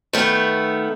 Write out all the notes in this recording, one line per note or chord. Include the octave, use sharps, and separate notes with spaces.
D#3 A3 B3